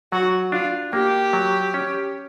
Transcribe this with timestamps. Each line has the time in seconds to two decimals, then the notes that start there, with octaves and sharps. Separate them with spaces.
0.12 F#3 F#4
0.52 D4 F4
0.93 A#3 G4
1.33 F#3
1.74 C#4